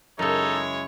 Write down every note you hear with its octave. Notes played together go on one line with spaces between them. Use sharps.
F#2 C#3 G#3 D#4 E4 A4 C#5